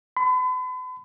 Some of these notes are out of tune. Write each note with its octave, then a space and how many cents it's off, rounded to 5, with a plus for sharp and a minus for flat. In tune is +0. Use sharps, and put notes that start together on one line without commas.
B5 +40